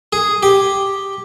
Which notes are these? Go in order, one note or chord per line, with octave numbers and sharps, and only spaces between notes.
G#4
G4